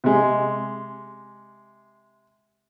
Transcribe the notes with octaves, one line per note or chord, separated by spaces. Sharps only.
C3 G#3